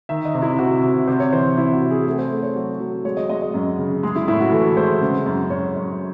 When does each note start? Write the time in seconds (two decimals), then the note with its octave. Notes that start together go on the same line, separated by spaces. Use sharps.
0.09 D#3 E5
0.25 D#5
0.34 C3
0.42 E4
0.59 C3 F#4
0.83 C3
1.07 C3 C5
1.20 C#5
1.32 E3 C5
1.57 C3 E4
1.73 F#4
1.82 C3
1.91 G#4
2.06 A3 A4
2.19 C5
2.31 A3
2.43 C#5
2.55 F#3 F#4
2.80 F#3
3.05 G#3 C#5
3.17 D#5
3.29 G#3 D#5
3.42 D#5
3.54 F#2
3.78 C#3
4.03 G#3 G#4
4.16 E4
4.28 A2 E4
4.41 F#4
4.52 E3 A4
4.77 G#3 C5
5.01 C#3
5.26 F#2
5.50 F#2 C#5
5.76 F#2